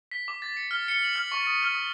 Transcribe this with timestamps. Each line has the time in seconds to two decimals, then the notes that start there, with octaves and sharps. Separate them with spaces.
0.11 B6
0.28 D6
0.42 A6
0.57 C#7
0.71 F6
0.88 C#7
1.03 F#7
1.16 F6
1.32 C#6
1.47 D#6
1.62 F6
1.75 D#6